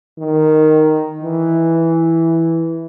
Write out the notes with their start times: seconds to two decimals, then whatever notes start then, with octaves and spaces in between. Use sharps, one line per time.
0.18 D#3
1.23 E3